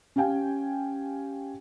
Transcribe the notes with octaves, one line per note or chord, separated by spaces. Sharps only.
C#4 G4 F5 G5 G#5